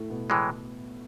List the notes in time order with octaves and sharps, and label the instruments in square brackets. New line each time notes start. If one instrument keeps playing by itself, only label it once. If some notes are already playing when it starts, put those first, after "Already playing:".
Already playing: [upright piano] A2 A3
B2 B3
[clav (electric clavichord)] A2 E3 G#3